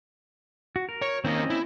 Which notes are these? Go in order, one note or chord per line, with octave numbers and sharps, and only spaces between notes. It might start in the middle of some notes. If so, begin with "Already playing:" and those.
F#4
A#4
C#5
D#3 A#3 C4 C#4 D#5
E4